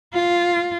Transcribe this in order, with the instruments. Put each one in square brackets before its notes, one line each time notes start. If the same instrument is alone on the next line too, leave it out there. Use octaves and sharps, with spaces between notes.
[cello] F4